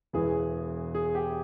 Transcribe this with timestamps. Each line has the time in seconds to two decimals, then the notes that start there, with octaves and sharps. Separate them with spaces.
0.13 E1 E2 E3 G#4
0.95 G#4
1.15 G4